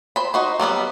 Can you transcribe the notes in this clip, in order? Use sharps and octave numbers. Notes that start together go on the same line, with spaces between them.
C5 B5
D#4 F#4 C5
F#3 G3 B3 B4